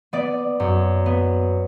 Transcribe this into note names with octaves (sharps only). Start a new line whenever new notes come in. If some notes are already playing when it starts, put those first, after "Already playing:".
B3 D5
F#2
B3